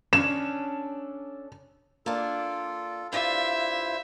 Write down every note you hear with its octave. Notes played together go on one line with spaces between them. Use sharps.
C#4 D4 A4 E7
A#3 D4 F4 A4
G2 E4 F4 C5 D5 E5